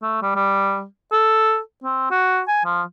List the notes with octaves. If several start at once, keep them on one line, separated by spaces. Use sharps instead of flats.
A3
G3
G3
A4
C4
F#4
G#5
F3